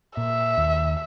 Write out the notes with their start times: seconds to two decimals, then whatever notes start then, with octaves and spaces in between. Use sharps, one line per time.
0.17 A#2 E5
0.58 D#2